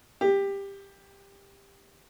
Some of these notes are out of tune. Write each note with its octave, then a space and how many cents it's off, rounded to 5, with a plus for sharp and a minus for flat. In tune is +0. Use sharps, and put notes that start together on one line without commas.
G4 +15